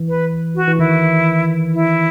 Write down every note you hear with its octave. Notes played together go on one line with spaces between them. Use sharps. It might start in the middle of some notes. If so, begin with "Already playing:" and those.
Already playing: E3
B4
F#4
E3
D#3 E4
E4